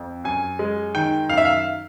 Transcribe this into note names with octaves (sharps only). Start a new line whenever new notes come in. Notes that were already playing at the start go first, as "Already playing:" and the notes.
Already playing: F2
F#2 G#5
G#3
D#3 G5
F#2 F5
E5
F5